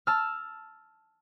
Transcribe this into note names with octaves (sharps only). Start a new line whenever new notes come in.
A5 E6 F6